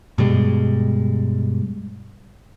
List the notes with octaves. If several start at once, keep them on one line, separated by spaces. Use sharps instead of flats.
G2 B2 G3 G#3